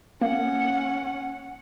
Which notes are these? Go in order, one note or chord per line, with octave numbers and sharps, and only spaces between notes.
A#3 C#4 F#5